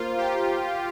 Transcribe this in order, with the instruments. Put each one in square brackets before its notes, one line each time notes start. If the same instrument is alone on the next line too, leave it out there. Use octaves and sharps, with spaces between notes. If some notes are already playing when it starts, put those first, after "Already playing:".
Already playing: [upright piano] A#3 C5 [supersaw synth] F4
[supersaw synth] G4